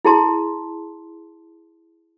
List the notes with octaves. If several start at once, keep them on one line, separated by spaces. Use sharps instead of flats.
E4 G#4 A5 C6